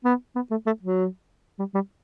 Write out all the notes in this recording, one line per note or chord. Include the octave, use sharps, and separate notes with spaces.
B3
B3
A3
A3
F#3
G3
G3